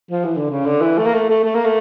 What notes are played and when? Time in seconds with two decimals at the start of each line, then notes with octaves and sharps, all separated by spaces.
0.11 F3
0.25 E3
0.37 D3
0.50 C#3
0.66 D3
0.81 E3
0.98 A3
1.06 A#3
1.14 A3
1.29 A3
1.45 A3
1.55 A#3
1.65 A3